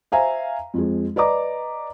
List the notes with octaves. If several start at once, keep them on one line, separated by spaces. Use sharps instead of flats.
C5 E5 F5 G#5 A#5
F2 F3 G#3
B4 D5 D#5 A#5 D6